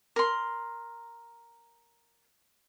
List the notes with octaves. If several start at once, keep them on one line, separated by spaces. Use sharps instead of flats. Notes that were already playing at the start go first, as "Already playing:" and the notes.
A#4 C6